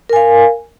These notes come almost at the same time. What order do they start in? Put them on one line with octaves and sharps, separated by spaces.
A#4 G#5 F5